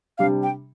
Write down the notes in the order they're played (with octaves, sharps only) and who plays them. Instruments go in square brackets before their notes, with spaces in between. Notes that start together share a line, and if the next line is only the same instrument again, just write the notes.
[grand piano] C3 G3 D4 [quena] F5
[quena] G5